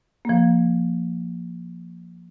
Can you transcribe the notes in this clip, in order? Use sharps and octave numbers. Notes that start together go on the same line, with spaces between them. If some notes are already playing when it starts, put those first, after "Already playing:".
F3 A#3